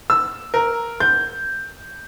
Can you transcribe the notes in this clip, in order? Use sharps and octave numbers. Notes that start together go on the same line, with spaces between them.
E6
A#4
G6